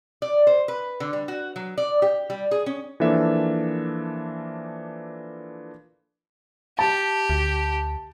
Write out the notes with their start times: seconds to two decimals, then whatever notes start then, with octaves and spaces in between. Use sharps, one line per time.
0.22 D5
0.47 C5
0.68 B4
1.00 D3
1.13 G3
1.28 F#4
1.56 F#3
1.78 D5
2.02 G4
2.30 G3
2.51 G#4
2.66 C#4
3.00 E3 F3 A#3 D4 A4 E5
6.79 G4 A5
7.30 D2